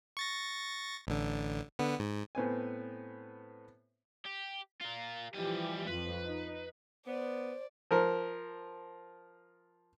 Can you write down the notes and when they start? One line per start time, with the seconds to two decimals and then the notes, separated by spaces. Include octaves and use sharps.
0.17 C#6 A6 A#6
1.07 A1 D3
1.78 D3 B3
1.99 G#2
2.35 A2 B3 C4 G#5
4.26 G4
4.81 F4 A#4
5.35 E3 F3 G3 G4 G#5
5.87 F2 F3 F4 B4
6.24 D#4
7.07 B3 C5 D5
7.91 F3 A#4